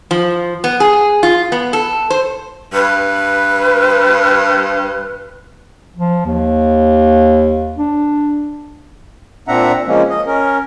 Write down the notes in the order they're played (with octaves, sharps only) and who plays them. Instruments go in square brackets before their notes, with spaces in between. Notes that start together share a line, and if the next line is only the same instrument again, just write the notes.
[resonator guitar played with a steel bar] F3
B3
G#4
F4
B3
A4
C5
[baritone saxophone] G2 [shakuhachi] B4
[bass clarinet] F3
D#2
D4
[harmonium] A#2 C4 D4 E5 F#5 A#5
F3 G#3 A#3 C#4
D#5
C#4 A#4